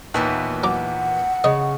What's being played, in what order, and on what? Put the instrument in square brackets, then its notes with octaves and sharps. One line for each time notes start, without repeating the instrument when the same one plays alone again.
[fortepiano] D#2 [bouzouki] A#2 E3 B3
[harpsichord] F#3 A#5 D6 [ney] F#5
[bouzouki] C#3 [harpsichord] C#5 D#5